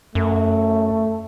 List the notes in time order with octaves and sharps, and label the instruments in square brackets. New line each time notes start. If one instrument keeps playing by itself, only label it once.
[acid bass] F#2 [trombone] A3